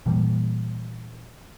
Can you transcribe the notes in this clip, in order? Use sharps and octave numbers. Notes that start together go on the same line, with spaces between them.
A#2 E3 G3 A#3